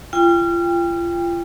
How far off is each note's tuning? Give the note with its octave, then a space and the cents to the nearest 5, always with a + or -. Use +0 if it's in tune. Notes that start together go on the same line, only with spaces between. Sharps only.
F4 -30 G5 +25